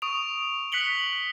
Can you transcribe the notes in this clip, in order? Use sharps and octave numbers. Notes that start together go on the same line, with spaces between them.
C#6 D#6 D7 F7
F#6 B6 C#7 F#7 G7